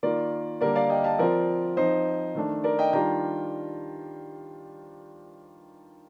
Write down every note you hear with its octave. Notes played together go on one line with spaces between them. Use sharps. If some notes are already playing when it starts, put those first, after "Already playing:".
D#3 A#3 F4 A#4 D5
D3 G3 A#3 A#4 D5
D5 F5
D#5 G5
F5 A5
F3 C4 F4 A#4 D5
F3 C4 D#4 C5 D#5
D#3 A3 D4
A#4 D5
D#5 G5
D#3 G3 D4 F4 G5 A#5